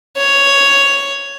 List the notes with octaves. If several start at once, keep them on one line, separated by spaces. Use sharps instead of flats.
C#5